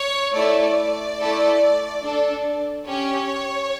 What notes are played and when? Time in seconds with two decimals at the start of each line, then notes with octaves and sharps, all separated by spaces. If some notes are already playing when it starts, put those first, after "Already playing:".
Already playing: C#5
0.35 A3 E4 A4 D5
1.19 A3 E4 A4
2.03 D4 A4
2.87 C#4 G4 C#5